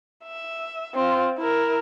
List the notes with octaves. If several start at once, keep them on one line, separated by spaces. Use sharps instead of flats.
E5
C4 F4
E4 A#4